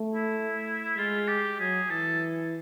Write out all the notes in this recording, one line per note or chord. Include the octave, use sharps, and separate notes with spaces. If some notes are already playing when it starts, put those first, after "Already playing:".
Already playing: A3
E4
G#3 F4
G4
F#3 G#4
E3 A4